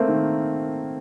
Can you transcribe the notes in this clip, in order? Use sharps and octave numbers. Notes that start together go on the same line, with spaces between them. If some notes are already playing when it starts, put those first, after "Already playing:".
Already playing: A3 A#3 C4
D#3